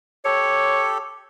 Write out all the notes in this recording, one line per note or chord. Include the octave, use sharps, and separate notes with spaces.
G4 A4 C#5